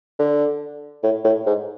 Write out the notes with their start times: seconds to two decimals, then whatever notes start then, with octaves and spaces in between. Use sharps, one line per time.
0.19 D3
1.03 A2
1.24 A2
1.46 G#2